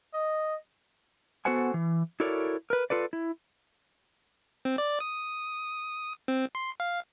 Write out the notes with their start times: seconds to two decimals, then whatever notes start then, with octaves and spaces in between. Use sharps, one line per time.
0.14 D#5
1.45 B3 F#4 A4 C5 F#5 G#5
1.74 E3
2.20 E4 F#4 A4 A#4 C#5 D5
2.70 A#4 B4
2.90 F4 A4 B4 D5
3.13 E4
4.65 C4
4.78 D5
5.00 D#6
6.28 C4
6.55 C6
6.80 F5